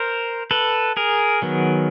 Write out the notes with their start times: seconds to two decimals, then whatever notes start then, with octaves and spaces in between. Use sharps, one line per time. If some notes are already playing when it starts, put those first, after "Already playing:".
Already playing: A#4 C5
0.51 A4 B4
0.97 G#4 A#4
1.42 D#3 F#3 B3